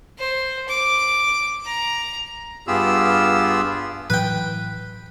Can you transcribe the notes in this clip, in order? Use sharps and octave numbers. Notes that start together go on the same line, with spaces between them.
C5
D6
A#5
G2 B3 F4 G4 G#4 E6
A2 E3 F#3 B4 G5